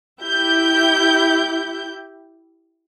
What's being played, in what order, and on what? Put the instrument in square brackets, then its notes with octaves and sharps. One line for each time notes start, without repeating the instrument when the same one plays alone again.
[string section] E4 G4 G6